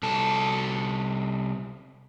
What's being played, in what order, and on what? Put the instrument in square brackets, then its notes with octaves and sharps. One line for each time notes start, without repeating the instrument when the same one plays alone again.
[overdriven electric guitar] C2 A4